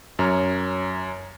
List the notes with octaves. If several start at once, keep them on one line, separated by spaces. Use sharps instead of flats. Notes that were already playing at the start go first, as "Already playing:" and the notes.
F#2 C#5 A#5 F6